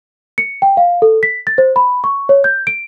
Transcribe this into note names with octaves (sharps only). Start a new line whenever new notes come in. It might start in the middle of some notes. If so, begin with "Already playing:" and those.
C#7
G5
F5
A4
B6
A6
C5
B5
C#6
C#5
G6
D7